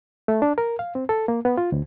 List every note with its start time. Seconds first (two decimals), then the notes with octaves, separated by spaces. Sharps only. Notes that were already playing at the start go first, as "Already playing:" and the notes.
0.28 A3
0.42 D4
0.58 A#4
0.79 F5
0.95 C4
1.09 A4
1.28 A#3
1.45 B3
1.58 F4
1.72 D2